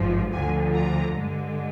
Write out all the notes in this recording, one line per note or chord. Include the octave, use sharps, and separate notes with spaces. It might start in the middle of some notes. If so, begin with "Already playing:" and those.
Already playing: G#1 G2 F3
D2 D3 F3 G#5
A#5
G2 D3 G#3